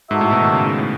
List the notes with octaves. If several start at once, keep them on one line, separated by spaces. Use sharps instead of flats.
G#2 D#4 F#4 A4 E5
A2
B2
D#3
C#3
G#2
A2